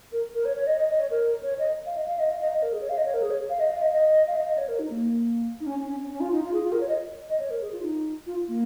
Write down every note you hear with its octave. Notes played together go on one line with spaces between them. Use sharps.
A#4
A#4
C#5
C#5
D#5
D#5
D#5
C#5
A#4
C#5
D#5
F5
D#5
F5
D#5
F5
D#5
D#5
A#4
G#4
C#5
F5
D#5
C#5
A#4
G#4
C#5
F5
D#5
F5
D#5
D#5
F5
D#5
D#5
C#5
A#4
D#4
A#3
D#4
C#4
C#4
C#4
C#4
F4
D#4
F4
G#4
F4
A#4
C#5
D#5
D#5
C#5
A#4
G#4
F4
D#4
F4
A#3